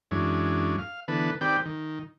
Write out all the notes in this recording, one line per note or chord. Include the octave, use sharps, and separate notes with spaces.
F#2 E3 G#3 C#4 D4
F5
D3 E3 B3 A4 B4
D#3 C4 G4 B4 D5 G5
D#3